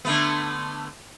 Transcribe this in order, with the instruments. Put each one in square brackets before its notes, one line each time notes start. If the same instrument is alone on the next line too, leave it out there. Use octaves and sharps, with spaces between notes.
[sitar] D3 A3 B3